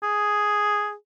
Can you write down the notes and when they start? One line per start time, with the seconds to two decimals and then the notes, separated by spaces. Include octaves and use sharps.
0.03 G#4